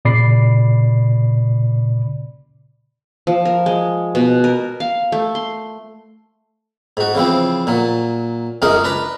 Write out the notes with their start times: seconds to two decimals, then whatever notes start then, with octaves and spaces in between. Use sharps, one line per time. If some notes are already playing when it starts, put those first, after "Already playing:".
0.05 A#2 C#3 D5 B5 D6 C7
3.27 F3
3.45 A#4
3.66 G#3
4.15 B2
4.44 A#4
4.80 F5
5.12 A3
5.35 C6
6.97 G#2 F#4
7.15 C#3 E3 F3 C4
7.67 A#2 F#3
8.62 C#2 F#2 G#3 C#4 A#4 D#5
8.84 D4 B4 A#5